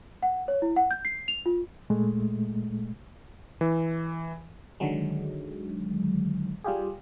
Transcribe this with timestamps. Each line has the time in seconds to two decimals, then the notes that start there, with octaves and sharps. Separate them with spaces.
0.23 F#5
0.48 C#5
0.62 E4
0.76 F#5
0.91 G6
1.05 C7
1.28 F7
1.46 F4
1.90 A#2 G#3 A3
3.61 E3
4.80 D3 D#3 F#3 G#3
6.64 G3 F4 G4 G#4